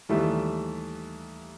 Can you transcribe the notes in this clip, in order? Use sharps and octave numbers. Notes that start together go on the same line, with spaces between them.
D#2 E3 G3 A3 E5